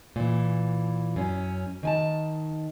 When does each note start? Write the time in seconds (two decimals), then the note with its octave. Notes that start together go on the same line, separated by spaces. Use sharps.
0.16 A#2 E3
1.16 F#2 C#4
1.83 D#3 G#5 A5